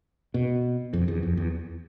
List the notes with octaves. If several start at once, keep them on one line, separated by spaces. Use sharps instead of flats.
B2
F2
E2
F2
E2